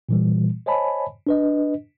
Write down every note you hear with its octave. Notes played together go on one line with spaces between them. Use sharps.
A#2 E3 G3
C5 C#5 D#5 G#5 A5 B5
D4 B4 D#5